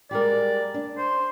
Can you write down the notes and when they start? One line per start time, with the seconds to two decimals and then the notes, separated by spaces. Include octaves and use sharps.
0.11 G3 G#3 A#4 D5
0.74 D4
0.98 C5